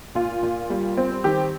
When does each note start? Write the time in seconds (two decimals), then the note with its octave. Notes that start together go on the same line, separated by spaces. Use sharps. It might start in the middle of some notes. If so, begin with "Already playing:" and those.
0.15 A#2 F4
0.43 A#2
0.70 G3
0.97 C4
1.24 D#3 G4